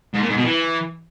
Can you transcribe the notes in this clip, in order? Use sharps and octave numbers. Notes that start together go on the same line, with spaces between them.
G#2
A#2
G#2
B2
E3